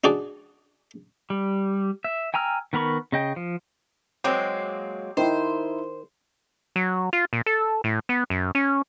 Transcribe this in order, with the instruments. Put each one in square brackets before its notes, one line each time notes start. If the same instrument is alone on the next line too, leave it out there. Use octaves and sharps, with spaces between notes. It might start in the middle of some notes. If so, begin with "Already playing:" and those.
[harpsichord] D4 D#4 F#4 G#4 D5
[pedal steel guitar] G3
E5
G5 G#5 A#5 E6 F6
D#3 B3 A#4 B5 C#6
C#3 D#5 G5
F3
[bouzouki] F#3 G#3 A#3 [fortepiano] C4 [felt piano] D6
[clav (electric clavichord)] D#3 [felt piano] D#4 E4 [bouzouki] C5
[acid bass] F#3
F4
A#2
A4
A2
B3
F#2
C#4